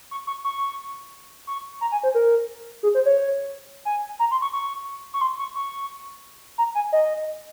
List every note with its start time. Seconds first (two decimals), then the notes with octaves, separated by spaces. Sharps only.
0.11 C#6
0.27 C#6
0.45 C#6
1.47 C#6
1.81 A#5
1.92 G#5
2.03 C5
2.15 A#4
2.83 G#4
2.95 C5
3.06 C#5
3.85 G#5
4.19 A#5
4.31 C6
4.42 C#6
4.53 C#6
5.14 C#6
5.21 C6
5.39 C#6
5.55 C#6
6.58 A#5
6.75 G#5
6.93 D#5